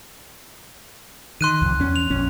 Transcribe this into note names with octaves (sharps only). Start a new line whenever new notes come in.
D#3 C6 F#6 D#7
C2 F2
E2 C#4
F7
A#1 F2 C#4